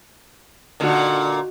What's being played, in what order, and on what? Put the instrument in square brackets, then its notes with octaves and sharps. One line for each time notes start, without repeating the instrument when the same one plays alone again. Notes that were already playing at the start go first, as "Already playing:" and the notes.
[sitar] A#2 D3 [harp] D#4 F#4